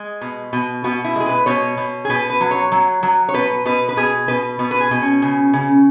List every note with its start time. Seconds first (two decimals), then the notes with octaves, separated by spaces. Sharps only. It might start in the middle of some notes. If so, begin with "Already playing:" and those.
Already playing: G#3
0.21 B2
0.53 B2
0.84 B2 F#4
1.04 E4
1.16 G#3 G#4
1.26 B4
1.46 B2 C#5
1.77 B2
2.05 G#4
2.10 B2 B4
2.30 B4
2.40 F#3
2.51 C#5
2.72 F#3
3.03 F#3
3.29 C#5
3.34 B2 B4
3.66 B2 B4
3.89 B4
3.97 B2 G#4
4.28 B2 B4
4.59 B2
4.71 B4
4.81 G#4
4.91 B2
5.02 C#4
5.22 C#3
5.53 C#3